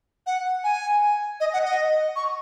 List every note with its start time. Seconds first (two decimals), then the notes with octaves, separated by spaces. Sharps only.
0.27 F#5
0.64 G#5
1.40 D#5
1.53 F#5
1.65 D#5
2.16 C#6